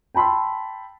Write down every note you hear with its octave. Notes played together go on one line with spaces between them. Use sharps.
G5 A5 B5 C6 E6